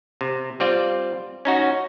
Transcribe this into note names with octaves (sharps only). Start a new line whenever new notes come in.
C3
G3 C4 F4 D5
C#4 D#4 F#4